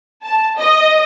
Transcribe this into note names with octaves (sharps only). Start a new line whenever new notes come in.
A5
D#5